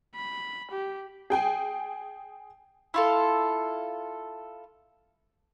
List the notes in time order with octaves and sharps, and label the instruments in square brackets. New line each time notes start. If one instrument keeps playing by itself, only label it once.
[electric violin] B5
G4
[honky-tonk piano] G#4 G5 G#5
[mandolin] E4 F4 A4